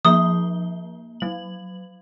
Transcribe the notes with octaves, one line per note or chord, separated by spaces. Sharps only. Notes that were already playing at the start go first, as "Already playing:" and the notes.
F3 A#3 D#6 G7
F#3 F#7